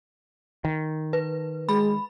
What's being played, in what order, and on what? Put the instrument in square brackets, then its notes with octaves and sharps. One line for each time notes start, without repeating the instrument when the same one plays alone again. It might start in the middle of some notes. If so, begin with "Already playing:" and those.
[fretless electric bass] D#3
[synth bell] B4
[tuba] G#3 [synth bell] B5